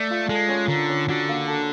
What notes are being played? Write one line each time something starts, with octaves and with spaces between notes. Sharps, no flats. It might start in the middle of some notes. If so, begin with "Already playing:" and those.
Already playing: A3 D5
F4
G#3 A4
C#4
D3 A#4
C#4
D3 F#4
A#3
A4